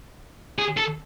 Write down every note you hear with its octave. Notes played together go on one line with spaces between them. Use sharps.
G#4
A4